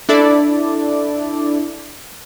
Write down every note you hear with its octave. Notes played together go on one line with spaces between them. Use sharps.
D4 E4 A4 D5